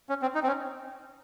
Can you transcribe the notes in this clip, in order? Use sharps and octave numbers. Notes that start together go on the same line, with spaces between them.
C#4
C4
D#4
C4
C#4